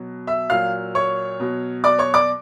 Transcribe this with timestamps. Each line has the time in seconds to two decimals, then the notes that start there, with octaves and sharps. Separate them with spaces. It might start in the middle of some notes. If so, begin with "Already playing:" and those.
Already playing: B2 F#3
0.27 E5 E6
0.50 A#2 F#3 F5 F6
0.95 C#5 C#6
1.40 B2 F#3
1.84 D5 D6
1.99 C#5 C#6
2.14 D5 D6